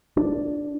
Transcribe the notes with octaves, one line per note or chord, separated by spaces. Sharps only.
D4